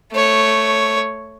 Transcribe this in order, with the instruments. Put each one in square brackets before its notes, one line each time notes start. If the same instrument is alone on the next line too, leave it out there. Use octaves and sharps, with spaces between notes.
[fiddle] A3 C#5